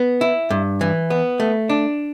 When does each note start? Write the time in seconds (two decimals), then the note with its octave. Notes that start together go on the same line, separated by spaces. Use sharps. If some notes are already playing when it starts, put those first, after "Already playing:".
Already playing: B3
0.21 E4
0.50 G2
0.81 E3
1.10 B3
1.40 A3
1.69 D4